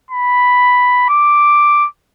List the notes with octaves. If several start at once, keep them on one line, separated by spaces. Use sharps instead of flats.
B5
D6